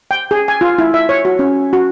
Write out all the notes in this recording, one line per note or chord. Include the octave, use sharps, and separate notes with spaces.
G5
G#4
G#5
F4
E4
E5
C#5
F#4
C#4
F#4